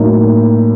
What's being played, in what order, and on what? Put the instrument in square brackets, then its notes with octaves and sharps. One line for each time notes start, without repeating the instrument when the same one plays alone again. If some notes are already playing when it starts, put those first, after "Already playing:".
Already playing: [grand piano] A2 F#3 A#3 D#4